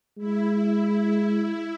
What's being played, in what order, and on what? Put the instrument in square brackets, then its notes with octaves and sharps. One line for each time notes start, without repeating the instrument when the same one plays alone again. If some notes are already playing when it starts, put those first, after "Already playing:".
[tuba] G#3 [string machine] E4